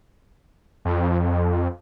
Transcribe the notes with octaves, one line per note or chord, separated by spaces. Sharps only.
F2